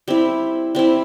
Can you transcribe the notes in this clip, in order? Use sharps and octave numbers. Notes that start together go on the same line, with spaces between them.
G3 C4 E4
G3 C4 E4